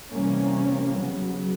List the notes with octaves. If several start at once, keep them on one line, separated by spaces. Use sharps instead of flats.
C3 E3 G3 A#3 C#4
C#3 F#3 B3